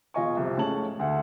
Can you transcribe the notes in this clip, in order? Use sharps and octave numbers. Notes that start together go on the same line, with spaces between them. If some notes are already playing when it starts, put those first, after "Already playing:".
E1 F4 D#5 G#5 C#6
C2 F2 C3
A2 G#3 C#4 A5 F#7
D2 F#5